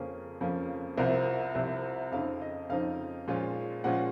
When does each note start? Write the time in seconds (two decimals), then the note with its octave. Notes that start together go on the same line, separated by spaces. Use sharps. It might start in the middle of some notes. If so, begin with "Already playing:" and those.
Already playing: F2 C#3 F3 A#3 C#4 G#4
0.41 F2 C#3 F3 A#3 C#4
0.98 C2 C3 F3 C4 A#4
1.55 C2 C3 F3 C4
2.12 F2 C#3 F3 C4 D#4 F5
2.42 D#5
2.69 F2 C#3 F3 C4 D#4 F5
3.28 A#2 F3 G#3 C#4 F4
3.84 A#2 F3 G#3 C#4 F4 F#5